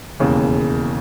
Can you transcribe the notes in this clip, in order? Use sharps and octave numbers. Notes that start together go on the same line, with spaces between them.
E1 D#2 C#3 E3